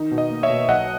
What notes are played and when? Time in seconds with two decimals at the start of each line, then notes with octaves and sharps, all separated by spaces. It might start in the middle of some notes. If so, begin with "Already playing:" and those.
Already playing: D#3 D#4
0.11 B2
0.18 D#5
0.31 A#3
0.43 C#5 E5
0.50 B2
0.68 B1 D#5 F#5